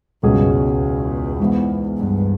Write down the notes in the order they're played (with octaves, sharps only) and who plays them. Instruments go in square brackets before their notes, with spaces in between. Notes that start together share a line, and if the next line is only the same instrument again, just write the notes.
[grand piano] C#2 B2 G#3 C#4 G#4 [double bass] G2
[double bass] E2
E2
[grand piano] G#2 E3 G#3 B3
[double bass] G2